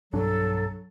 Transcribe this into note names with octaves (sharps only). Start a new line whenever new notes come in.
B1 G2 F#3 D4 A4